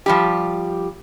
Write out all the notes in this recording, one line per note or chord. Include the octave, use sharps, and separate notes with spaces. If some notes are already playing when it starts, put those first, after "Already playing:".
F3 G3 G4